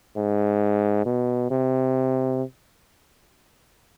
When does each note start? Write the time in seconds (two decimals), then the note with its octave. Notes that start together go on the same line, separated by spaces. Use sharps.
0.17 G#2
1.05 B2
1.51 C3